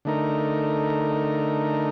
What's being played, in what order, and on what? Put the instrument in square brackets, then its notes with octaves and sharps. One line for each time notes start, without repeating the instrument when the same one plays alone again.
[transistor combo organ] D3 A3 D#4 A#4